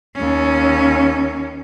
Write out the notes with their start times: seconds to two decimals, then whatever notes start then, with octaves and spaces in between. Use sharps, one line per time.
0.15 D#2 C#4